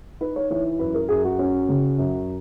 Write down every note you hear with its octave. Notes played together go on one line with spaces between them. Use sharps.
D#4 B4
C#5
E3 C#5
F#2 B4
A#4
F#2 G#4
F#4
C#4
C#3
F#2